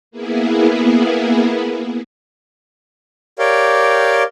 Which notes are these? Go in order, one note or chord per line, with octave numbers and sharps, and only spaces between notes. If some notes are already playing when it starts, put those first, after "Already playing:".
A#3 B3 E4 G#4
G4 A#4 C#5 D5 F5 G5